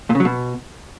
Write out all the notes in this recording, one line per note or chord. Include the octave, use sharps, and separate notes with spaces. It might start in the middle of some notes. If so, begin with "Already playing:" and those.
A#2
C#3
F#3
B2